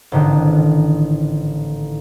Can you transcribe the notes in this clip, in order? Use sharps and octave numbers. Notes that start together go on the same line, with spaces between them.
A1 G#2 D3 D#3